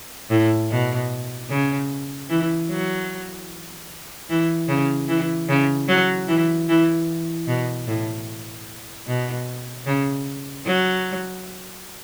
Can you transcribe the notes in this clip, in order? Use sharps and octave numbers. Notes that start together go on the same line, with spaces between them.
A2
B2
C#3
E3
F#3
E3
C#3
E3
C#3
F#3
E3
E3
B2
A2
B2
C#3
F#3